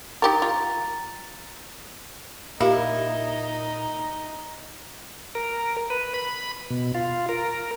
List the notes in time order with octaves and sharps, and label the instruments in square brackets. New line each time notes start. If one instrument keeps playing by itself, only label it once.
[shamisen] D#4 G4 A#4 [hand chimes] A#5 A6
[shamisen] F4
[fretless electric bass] A#2 [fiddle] D#4 [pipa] E4 [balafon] G4 A#4 F5
[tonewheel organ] A#4
B4
B5
B2
F4
A#4